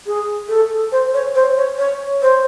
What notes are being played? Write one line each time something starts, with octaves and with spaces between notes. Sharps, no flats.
G#4
A4
C5
C#5
C5
C#5
C#5
C5